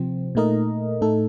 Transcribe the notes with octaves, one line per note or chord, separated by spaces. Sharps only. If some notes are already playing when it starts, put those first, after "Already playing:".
Already playing: C3 F3 C4
A#2 A3 D#4 A#4 D#5
A2 A3 D#4 A4